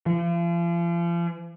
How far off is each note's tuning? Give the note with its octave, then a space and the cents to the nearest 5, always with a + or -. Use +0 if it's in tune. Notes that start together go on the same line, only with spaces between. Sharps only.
F3 -40